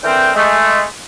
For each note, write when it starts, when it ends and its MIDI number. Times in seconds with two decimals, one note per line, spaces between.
0.03 0.30 50
0.03 0.30 52
0.03 0.30 60
0.03 0.30 70
0.03 0.30 79
0.34 0.81 56
0.34 0.81 57